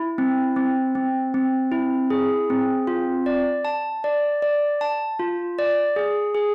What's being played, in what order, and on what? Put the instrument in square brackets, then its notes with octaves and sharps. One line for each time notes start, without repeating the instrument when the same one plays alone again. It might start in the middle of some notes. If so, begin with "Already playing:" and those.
Already playing: [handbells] E4
C4
C4
C4
C4
E4
G#4
C4
F4
D5
A5
D5
D5
A5
F4
D5
G#4
G#4